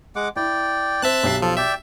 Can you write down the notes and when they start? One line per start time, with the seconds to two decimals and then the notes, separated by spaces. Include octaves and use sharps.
0.16 G#3 F#5 D6
0.36 E4 D5 G5
1.02 C4 C5 E5 A5 F#6
1.24 B1 G4 C7
1.42 F3 A4
1.57 D5 E5 G5